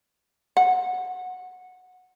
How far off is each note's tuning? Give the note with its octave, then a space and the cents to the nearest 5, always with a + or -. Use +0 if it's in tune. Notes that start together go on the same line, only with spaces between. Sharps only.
F#5 -15